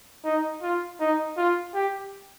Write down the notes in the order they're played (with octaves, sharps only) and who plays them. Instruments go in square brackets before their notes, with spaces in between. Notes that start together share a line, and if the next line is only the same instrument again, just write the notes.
[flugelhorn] D#4
F4
D#4
F4
G4